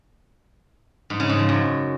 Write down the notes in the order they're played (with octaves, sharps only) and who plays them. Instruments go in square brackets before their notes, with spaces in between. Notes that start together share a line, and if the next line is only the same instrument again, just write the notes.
[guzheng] G#2
C#3
G#2
F3
F#2